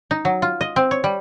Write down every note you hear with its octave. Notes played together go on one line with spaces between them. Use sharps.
D#4
F#3
F4
D#5
C4
C#5
G3